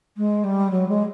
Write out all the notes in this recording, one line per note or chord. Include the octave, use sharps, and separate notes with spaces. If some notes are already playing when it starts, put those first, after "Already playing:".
G#3
G3
F#3
G#3